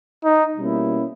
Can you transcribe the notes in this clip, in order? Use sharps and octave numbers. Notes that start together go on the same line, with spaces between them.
D#4
B2 G3 A#3 C#4 E4